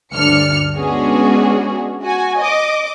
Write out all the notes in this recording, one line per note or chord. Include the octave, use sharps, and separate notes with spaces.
D2 G2 D4 F6 C#7
G#3 B3 C#4 D4 F#4 G#4
F#4 G#5
D#5 D6